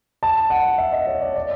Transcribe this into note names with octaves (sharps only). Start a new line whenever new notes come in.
A5
F#5
E5
D#5
C#5
D5
D5